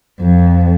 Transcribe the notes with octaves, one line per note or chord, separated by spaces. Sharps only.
F2